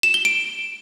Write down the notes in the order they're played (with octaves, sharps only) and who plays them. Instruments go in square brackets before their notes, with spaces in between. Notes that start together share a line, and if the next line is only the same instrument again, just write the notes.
[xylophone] E7
G7
D7